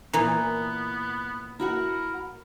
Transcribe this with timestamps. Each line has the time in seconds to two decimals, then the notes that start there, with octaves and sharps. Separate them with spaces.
0.13 A#2 E3 B3 A#5
1.60 E4 F#4 A#4 F#5